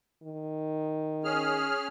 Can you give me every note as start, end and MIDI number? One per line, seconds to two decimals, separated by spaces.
0.23 1.77 51
1.24 1.88 61
1.24 1.88 68
1.24 1.88 89